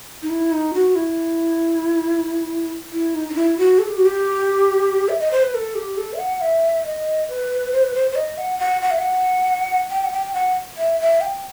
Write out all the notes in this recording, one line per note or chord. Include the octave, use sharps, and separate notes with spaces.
D#4
E4
D#4
F#4
E4
E4
D#4
D#4
E4
F#4
A4
G4
F#4
G4
E5
D#5
C5
B4
A4
G4
A4
E5
F#5
E5
D#5
B4
C5
B4
C5
C5
D#5
F#5
F#5
F#5
E5
F#5
G5
F#5
G5
F#5
E5
E5
G5